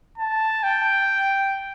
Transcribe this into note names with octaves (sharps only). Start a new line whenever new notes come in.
A5
G5